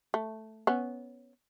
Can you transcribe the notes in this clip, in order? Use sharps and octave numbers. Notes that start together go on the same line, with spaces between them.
A3
B3 C#4